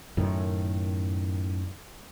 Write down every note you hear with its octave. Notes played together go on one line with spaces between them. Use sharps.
F#2 A2 D#3